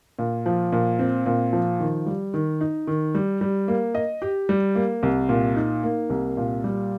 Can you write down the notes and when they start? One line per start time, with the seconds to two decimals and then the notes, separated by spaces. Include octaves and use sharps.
0.19 A#2
0.46 F3
0.72 A#2
0.99 C4
1.26 A#2
1.53 F3
1.80 D#3
2.06 G3
2.34 D#3
2.61 D#4
2.87 D#3
3.15 G3
3.41 G3
3.68 A#3
3.95 D#5
4.22 G4
4.49 G3
4.75 A#3
5.03 C2
5.29 A#2
5.56 D#4
5.83 A#3
6.10 C2
6.37 A#2
6.64 G3